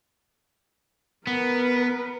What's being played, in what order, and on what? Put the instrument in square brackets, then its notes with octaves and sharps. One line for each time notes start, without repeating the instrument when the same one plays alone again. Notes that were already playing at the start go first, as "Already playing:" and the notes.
[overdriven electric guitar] B3 [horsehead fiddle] A#4 B4